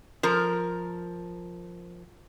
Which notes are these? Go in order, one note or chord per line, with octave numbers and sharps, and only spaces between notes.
F3 A#4